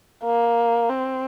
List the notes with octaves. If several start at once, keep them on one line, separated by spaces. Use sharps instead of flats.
A#3
C4